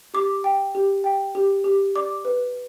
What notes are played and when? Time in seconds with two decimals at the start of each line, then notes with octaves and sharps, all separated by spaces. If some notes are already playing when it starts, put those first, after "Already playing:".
0.14 G4 D6
0.44 G5
0.75 G4
1.04 G5
1.35 G4
1.64 G4
1.95 D5 D6
2.25 B4